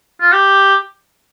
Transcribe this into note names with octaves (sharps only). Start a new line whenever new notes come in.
F4
G4